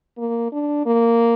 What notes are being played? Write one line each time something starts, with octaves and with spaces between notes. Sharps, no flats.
A#3
D4
A#3